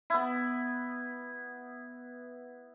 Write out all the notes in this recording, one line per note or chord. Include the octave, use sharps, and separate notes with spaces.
B3 E4